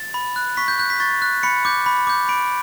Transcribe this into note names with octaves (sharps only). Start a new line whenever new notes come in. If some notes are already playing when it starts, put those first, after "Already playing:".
Already playing: A6
B5
F#6
C#6 B6
G6
F#6 G6
B6
C#6 A6
F#6
B5 C#7
D6 G6
B5
D6 G6
B5 D7